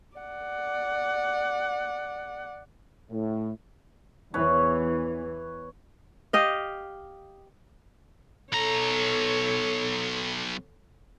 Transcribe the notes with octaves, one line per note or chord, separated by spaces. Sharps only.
D5 F#5
A2
E2 E3 B4 C#5
G4 D#5 F5
B1 A4 C#5 A#5